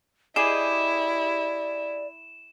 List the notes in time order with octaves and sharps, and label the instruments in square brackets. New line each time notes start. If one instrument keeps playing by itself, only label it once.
[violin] E4 [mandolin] G4 G#4 D#5 [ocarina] D5 [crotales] E7